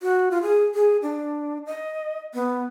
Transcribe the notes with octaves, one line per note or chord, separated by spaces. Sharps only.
F#4
F4
G#4
G#4
D4
D#5
B3